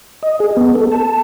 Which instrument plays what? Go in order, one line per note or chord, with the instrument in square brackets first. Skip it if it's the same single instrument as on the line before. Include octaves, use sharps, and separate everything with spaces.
[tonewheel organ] D#5
G#4
B3
A4
A5